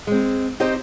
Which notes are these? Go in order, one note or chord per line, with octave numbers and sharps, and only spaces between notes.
G#3 C4
C4 D#4 G4 C5 D#5